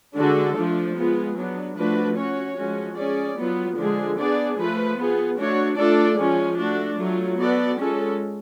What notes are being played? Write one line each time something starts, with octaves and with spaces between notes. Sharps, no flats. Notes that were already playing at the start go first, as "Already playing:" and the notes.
D3 G#3 D4 F#4 A4
F3 A3 D4 F4
G#3 B3 F4 G#4
F#3 B3 D4
F3 A3 D4 F#4 B4
C#4 F#4 C#5
F3 G#3 C#4 F#4
C#4 G#4 D5
F#3 B3 F4
D3 F3 G#3 D4 G#4
B3 D4 G#4 D5
F3 A3 F4 B4
B3 F4 G#4
A3 D4 F#4 C#5
A3 D4 F4 A4 D5
F3 G#3 C#4 F4
A3 D4 F#4
F#3 A3 F4
B3 F#4 A4 D5
G#3 C#4 F4 A4